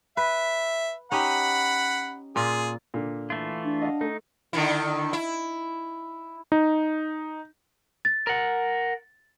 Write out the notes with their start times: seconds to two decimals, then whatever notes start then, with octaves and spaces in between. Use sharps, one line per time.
0.17 B4 E5
1.12 C#4 D#4 G4 F#5 B5
2.36 A#2 F4 G#4
2.94 A#2 D3
3.30 E3 A3 F4
3.64 D4
3.82 D#5 F5 F#5
4.01 A3 D#4
4.53 D3 D#3 E4
5.13 E4
6.52 D#4
8.05 A6
8.27 A#4 F#5